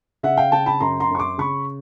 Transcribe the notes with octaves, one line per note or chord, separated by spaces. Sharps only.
C#3 E5 F#5
F5 G5
C#3 G5 A5
A5 B5
F#2 A#5 C6
A#5 C6
F#2 C#6
C6 D6
C#3 B5 C#6